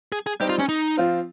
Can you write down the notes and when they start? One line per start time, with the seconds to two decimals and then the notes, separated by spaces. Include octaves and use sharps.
0.12 G#4
0.27 G#4
0.40 G3 C4 D#4 G4
0.49 F4
0.59 C#4
0.69 D#4
0.97 F3 C4 F4